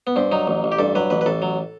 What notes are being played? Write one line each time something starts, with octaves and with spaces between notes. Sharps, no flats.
B3
G2 C4
F#3 D#4
A1
A1
G4
G2 A4
F#3 B4
A1 B4
B4
A1 A4
F#3